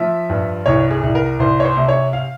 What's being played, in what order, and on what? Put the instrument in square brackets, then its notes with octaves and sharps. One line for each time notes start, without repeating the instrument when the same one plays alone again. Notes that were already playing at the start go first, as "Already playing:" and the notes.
Already playing: [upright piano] F3 E5
G2
C2 C#5
G#4
C2
A#4
C2 C5
C#5
C5
C3
C#5
F5